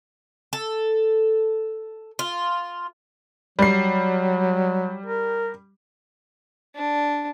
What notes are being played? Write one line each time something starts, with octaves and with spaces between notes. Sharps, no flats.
A4
F4
F#3 G3 C7
A#4
D4